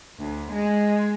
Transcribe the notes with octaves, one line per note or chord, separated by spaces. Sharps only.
D2
G#3